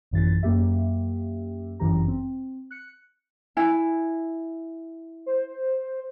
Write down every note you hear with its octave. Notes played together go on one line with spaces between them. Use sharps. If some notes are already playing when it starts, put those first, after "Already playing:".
A1 F#2 E3 A6
F#2 A#3 G4 E5
G1 F#2 E3 G4 A#5
C4
F#6 C#7
E4 G#5
C5